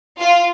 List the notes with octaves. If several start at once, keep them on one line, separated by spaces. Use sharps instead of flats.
F4